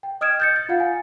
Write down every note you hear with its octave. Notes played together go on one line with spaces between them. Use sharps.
G5
D#5 D#6 F6 G#6 D7 E7
G6 A6 C#7
A6
F4 F5 F#5
G#5